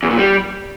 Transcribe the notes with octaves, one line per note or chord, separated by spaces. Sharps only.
E2
A#2
G3